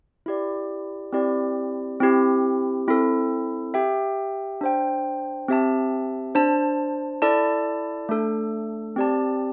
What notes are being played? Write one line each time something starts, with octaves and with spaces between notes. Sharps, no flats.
E4 G4 D5
C4 E4 G4 D5
C4 E4 G4
C4 E4 A4
G4 E5 G5
D4 C5 G5
C4 G4 E5 A5
D4 C5 A5
E4 A4 D5 A5
A3 D4 A4
C4 G4 D5 A5